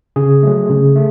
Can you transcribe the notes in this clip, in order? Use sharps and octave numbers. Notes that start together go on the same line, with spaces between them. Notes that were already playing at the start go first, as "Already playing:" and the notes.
C#3 G#4
F#3 A3
C#3
A3